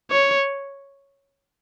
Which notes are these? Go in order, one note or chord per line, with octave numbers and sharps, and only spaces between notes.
C#5